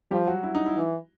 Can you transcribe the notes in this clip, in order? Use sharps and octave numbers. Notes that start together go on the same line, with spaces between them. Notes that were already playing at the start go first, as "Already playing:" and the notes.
F3 G3 G4
F#3 F#4
E4
D#4
E4
E3